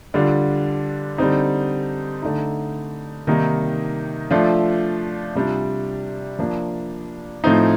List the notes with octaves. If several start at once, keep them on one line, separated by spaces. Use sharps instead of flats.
D3 G3 D4 F4
D3 G3 C4 D#4
D3 A3 D#4
C3 D#3 G3 A#3 D#4
F3 A3 D4 F4
C3 G3 D4 F4
F3 A#3 D4
A2 F3 A3 C4 D#4